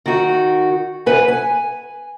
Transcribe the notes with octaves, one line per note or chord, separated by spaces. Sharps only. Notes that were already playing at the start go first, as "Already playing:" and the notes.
D#3 F#4
B4 F#5 G#5
G#5